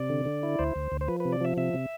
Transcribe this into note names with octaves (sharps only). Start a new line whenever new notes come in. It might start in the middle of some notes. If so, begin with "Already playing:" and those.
Already playing: C3 D5
D3
D3
E4
D2 C5
D2
D2
C5
F3 B4
C3 B4
D5
F3 E5
C3 E5
C3